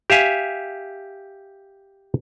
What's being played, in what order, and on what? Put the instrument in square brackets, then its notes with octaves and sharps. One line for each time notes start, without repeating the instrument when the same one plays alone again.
[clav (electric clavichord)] G4 E5 F5 G#5